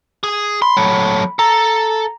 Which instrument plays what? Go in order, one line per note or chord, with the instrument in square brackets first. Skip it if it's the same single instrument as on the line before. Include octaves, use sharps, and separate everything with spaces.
[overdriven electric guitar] G#4
[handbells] B5 [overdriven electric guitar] C6
[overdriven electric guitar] F#3 A3
[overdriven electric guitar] A4 [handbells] A#5